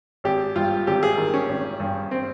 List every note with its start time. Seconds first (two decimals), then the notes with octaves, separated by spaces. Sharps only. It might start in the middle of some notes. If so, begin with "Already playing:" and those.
0.24 G#1 G4
0.56 G2 F4
0.87 G#1 G4
1.03 G#4
1.17 D#3
1.34 C#4
1.49 G#1
1.80 G2
2.11 C4